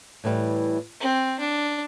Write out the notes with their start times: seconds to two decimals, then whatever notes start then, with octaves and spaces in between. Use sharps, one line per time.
0.24 A2 E3 G3
1.00 C4
1.39 D4